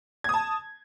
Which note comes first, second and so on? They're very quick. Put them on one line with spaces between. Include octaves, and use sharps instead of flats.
G#6 D#6 A5